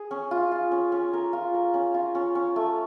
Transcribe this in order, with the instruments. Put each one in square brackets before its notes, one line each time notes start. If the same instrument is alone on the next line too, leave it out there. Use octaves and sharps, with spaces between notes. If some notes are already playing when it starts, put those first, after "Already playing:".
Already playing: [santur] G#4
C#4
F4
F4
C#4
C#4
A#4
F4
A#4
C#4
F4
C#4
C#4
A3